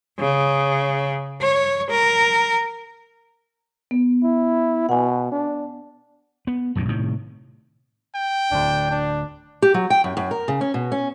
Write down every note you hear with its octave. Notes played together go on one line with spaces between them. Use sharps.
C#3
C#5
A#4
B3
E4
B2 F#5 G#5
D4
B3
B1 F#2 A2 D3
A2 C3 D#3
G5
D1 D2 D4
D4
G4
F#3
G5
F#2
F#2
A#4
C#3
C#4
B2
C#4